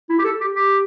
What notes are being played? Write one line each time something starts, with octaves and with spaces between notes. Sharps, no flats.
E4
G4
A4
G4
G4